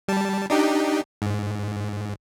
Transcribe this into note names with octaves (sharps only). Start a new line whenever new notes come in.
G3 A5
D4 D#4 G4
G#2